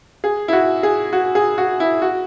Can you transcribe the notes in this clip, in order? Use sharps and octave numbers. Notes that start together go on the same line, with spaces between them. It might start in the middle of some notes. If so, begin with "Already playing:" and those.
G#4
E4
F#4
G#4
F#4
G#4
F#4
E4
F#4